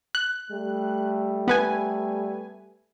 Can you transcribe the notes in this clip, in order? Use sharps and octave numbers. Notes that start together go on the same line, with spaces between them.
F#6
G3 A3
B3 B4 G#5